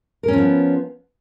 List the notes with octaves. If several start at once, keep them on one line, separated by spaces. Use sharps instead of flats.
F3 B3 C#4 A#4